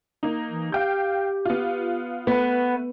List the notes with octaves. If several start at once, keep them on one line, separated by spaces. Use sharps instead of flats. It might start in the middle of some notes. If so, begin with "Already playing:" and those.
A#3 D#4
E3
G4 F5 G5 G6
B3 F4
A3 B3 B4